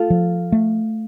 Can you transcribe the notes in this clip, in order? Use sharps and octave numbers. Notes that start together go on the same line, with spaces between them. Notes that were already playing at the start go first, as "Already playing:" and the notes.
Already playing: A3 F4 A4
F3
A3